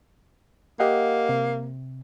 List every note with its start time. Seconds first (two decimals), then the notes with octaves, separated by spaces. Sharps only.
0.80 A#3 G4 D#5 F#5
1.29 C3